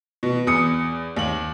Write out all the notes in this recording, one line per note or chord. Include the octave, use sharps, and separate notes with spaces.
B2
E2 D#6 C#7
D#2 F#7